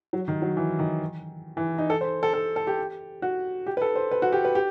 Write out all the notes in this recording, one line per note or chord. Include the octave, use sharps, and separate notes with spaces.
F#3
D#3
F#3
E3
D#3
E3
D#4
A4
C5
A4
A4
A4
G4
F#4
G4
B4
A4
C5
B4
F#4
G4
B4
G4